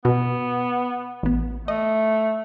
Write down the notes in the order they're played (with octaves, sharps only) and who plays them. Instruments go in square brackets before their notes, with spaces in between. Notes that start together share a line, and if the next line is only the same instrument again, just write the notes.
[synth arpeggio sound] B2 [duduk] B3
[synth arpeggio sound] A1 B3
[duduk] A3 [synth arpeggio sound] D#5